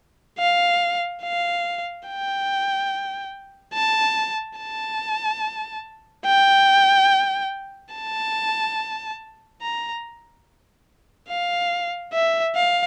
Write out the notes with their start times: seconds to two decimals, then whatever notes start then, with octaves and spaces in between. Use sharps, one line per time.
0.39 F5
1.22 F5
2.07 G5
3.74 A5
4.58 A5
6.26 G5
7.94 A5
9.62 A#5
11.30 F5
12.13 E5
12.55 F5